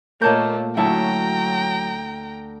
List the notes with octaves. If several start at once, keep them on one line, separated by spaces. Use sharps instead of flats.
A#2 A3 A#3 A#4 C#5 D#5 A5 G6
D2 F#3 C#4 E4 E5 G5 A5 A#5